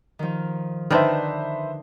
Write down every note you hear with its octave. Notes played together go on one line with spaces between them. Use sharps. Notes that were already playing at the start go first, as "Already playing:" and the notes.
D#3 F3
D3 D#3 D4 D#4 B4 C5 E5